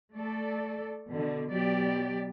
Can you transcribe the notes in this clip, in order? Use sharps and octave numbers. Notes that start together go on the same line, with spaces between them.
A3 A4 D5
B2 D3
B2 F#3 G4 D5